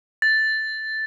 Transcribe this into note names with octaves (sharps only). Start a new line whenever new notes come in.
A6